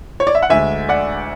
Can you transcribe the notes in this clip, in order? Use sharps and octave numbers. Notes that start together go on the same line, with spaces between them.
C#5
D5
E5
F#5
D2 D3 G#3 E5 G#5
D5 F#5